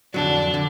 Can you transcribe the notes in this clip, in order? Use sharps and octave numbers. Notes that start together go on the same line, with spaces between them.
F2 D3 F#3 D4
D3